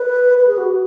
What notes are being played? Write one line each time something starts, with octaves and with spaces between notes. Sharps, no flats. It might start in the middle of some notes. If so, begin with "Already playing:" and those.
Already playing: B4
B4
G#4
F#4